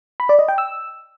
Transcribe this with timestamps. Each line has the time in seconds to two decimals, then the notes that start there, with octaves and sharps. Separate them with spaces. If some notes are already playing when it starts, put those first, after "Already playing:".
0.20 B5
0.29 D5
0.39 D#5
0.48 G5
0.58 E6